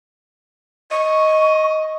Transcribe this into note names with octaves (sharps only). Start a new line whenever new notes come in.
D#5 C#6